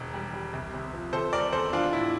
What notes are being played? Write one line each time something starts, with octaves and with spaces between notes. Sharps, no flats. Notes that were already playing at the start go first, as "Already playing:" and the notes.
Already playing: E1
G3
G3
C2
C3
F3
C3 A4 C5
G3 A#4 D5
E2 A4 C5
G3 D4 F4
A2 E4